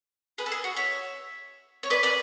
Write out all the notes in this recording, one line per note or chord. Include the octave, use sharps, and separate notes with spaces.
G#4 B4
A4
G#4
F#4
C#5 E5
C#5
B4 D5
B4 D5